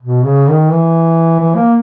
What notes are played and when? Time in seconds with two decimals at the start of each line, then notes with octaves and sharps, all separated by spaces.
0.02 B2
0.25 C#3
0.48 D#3
0.72 E3
1.40 E3
1.56 A#3